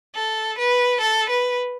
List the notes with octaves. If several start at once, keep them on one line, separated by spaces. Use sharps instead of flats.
A4
B4
A4
B4